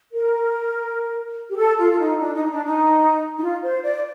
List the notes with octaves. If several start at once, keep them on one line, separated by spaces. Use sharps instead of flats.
A#4
G4
A4
F4
F4
D#4
D4
D#4
D#4
D4
D#4
D#4
F4
C5
D5